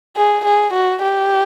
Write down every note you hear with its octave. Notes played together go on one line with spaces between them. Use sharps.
G#4
G#4
F#4
G4